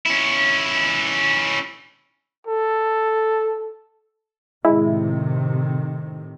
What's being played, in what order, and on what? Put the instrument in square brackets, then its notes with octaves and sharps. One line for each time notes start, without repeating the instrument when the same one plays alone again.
[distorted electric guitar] C#4 E4
[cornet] A4
[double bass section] A2 C3 D#3 [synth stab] G#3 E4